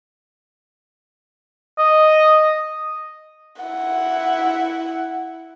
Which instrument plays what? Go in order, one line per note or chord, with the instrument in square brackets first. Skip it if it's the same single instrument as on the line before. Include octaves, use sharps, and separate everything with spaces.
[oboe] D#5
[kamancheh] E4 F#5